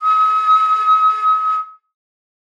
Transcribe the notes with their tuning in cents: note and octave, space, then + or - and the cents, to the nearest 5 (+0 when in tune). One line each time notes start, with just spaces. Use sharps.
D#6 +45